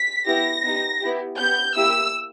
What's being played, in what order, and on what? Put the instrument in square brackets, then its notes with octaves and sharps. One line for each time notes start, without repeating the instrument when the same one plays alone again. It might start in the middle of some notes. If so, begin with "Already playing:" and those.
Already playing: [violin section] B6
B3 E4 G4 A#6
B3 D#4 G4
B3 E4 G4
B3 G4 G6
A#3 E4 G4 E6